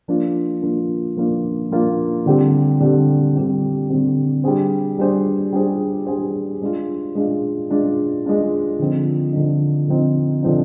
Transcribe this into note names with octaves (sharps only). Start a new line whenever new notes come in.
F3 A#3 D4 F4
F3 A#3 D4 F4
F3 A#3 D4 F4
F3 A#3 D4 F4
D3 G3 C4 G4
D3 G3 C4 G4
D3 G3 C4 G4
D3 G3 C4 G4
G3 D4 G#4 C5
G3 D4 G#4 C5
G3 D4 G#4 C5
G3 D4 G#4 C5
G#3 D4 F4
G#3 D4 F4
G#3 D4 F4
G#3 D4 F4
D3 F3 C4 D#4
D3 F3 C4 D#4
D3 F3 C4 D#4
D3 F3 C4 D#4